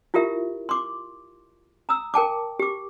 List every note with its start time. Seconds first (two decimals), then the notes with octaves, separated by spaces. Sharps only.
0.14 E4 F4 G4 A#4 E5
0.69 C6 D6
1.89 A#5 D#6 E6
2.14 A#4 G5 A5 D6
2.59 G4 D6